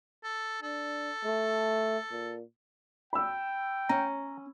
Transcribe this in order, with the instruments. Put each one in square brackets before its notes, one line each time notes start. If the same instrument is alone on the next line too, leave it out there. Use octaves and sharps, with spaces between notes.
[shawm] A4
[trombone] D4 [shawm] A4
[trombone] A3
A#2
[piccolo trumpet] G5 [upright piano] B5 E6
[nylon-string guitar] C#4 [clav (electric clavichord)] A#5